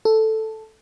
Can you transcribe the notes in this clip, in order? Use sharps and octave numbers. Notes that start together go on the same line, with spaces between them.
A4